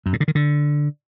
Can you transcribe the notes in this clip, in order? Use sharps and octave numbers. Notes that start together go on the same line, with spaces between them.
F#2
A2
D3
D#3
D3